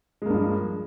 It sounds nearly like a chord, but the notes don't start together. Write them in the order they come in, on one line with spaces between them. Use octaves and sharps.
G#3 A#3 G2 F3